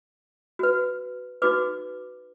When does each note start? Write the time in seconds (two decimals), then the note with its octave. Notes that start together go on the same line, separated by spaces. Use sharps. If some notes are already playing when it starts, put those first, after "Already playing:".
0.59 F#4 B4
1.42 D#4 F#4 B4 D6